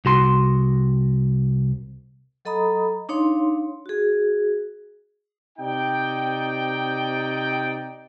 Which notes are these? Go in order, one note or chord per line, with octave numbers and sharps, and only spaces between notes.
C2 F#4 C6
F#3 A4 D#5 A#5 B5 D#6
D4 D#4 C#5 F5 C6
F#4 G#4
C3 D#4 D5 G5